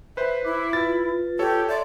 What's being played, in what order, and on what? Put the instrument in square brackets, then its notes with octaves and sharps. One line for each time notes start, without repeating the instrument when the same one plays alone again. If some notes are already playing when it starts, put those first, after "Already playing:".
[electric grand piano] B4 C5 [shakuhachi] E5
[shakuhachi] E4 [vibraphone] D6
[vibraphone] F4 B4 [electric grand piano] A6
[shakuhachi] G4 [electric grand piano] A4 C#5
[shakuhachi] D5 [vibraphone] E5 C6